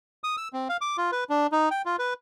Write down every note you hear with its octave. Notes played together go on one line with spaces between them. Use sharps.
D#6
E6
C4
F5
D6
F4
B4
D4
D#4
G5
F4
B4